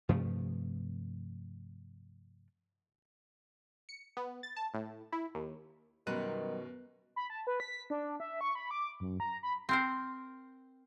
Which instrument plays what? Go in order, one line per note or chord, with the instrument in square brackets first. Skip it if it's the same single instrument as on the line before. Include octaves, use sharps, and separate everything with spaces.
[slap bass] G2 C3 F3 A3
[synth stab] C#7
B3
A6
A5
A2
E4
D#2
[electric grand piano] F#2 F#6 D#7 [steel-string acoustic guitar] B2 [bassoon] D#3 [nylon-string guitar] F#3 G3 B3
[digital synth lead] B5
A5
B4
B6
D4
E5
C#6
B5
D6
F#2
A#5
B5
[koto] C4 A#4 C5